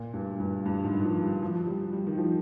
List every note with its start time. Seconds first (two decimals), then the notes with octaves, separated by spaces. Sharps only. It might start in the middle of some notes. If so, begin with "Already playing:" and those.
Already playing: A#2
0.14 G2
0.40 G2
0.65 G2
0.84 G#2
1.04 F3
1.23 G3
1.42 F3
1.67 G3
1.93 G3
2.07 D#3
2.18 F3